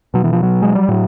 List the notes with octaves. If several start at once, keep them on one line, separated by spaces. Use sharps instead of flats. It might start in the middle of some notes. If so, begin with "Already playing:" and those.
B2 F#3
E3
F3
F#3
G#3
G3
A2 F#3